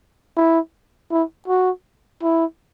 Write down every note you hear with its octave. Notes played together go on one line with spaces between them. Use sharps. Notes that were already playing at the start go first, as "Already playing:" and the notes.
E4
E4
F#4
E4